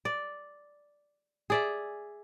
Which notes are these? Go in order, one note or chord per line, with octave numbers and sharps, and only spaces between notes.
D5
G#4 D5 E5